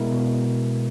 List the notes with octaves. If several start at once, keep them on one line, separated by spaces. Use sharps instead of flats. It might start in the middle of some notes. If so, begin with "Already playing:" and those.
Already playing: B2 G#3 B3 E4 A#4
B2